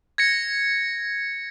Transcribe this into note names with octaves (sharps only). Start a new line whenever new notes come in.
G#6 A#6 C#7